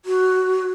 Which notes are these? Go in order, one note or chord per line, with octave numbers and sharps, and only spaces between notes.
F#4